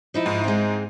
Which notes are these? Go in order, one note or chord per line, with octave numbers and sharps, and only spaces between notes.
F3 D#4 E4
G#2
G#3 C4